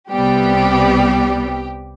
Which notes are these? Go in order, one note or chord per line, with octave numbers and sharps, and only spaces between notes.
C2 C3 G3 B3 G4